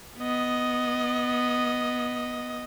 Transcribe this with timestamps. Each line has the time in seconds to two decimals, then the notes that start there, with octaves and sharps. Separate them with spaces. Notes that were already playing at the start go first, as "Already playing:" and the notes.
0.18 B3 D#5